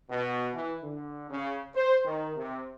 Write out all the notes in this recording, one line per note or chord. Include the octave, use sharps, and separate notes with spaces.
B2
E3
D3
C#3
C5
D#3
C3